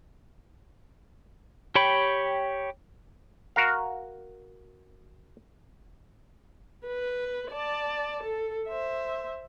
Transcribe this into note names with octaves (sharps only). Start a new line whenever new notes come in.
G4 C#5 G5 B5
F#4 A#4 F5
B4
D5 A5
A4
C5 E5